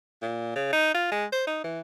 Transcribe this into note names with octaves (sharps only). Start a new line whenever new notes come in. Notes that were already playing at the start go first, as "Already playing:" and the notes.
A#2
C#3
D#4
F4
G#3
C5
D#4
E3